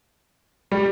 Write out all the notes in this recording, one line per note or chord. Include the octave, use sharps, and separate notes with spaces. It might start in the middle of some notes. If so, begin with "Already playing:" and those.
G3